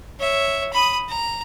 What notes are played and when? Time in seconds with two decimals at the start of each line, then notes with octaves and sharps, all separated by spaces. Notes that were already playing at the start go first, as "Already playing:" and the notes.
0.19 C#5 E5
0.72 B5 D#6
1.08 A#5